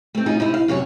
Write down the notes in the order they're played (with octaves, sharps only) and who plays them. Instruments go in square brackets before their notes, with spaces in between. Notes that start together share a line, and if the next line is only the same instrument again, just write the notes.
[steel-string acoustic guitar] A3 C4
C#4 D#4 F4 G#4
C3 D#4 E4
F5
F#2 C3 C#5 G#5